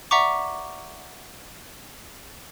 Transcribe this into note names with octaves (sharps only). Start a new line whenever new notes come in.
D5 E5 F#5 A#5 C#6 D6